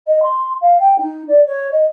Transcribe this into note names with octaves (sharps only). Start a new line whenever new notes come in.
D#5
C6
F5
G5
D#4
D5
C#5
D#5